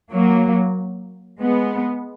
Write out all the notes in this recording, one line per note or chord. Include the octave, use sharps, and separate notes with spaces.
F#3 A#3
G#3 B3